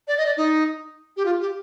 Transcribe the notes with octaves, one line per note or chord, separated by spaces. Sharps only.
D5
D#5
D5
D#4
G4
F4
G4